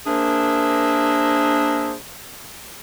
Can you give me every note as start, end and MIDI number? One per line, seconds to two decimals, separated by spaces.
0.07 1.93 58
0.07 1.93 62
0.07 1.93 68
0.07 1.93 70
0.07 1.93 72
0.07 1.93 76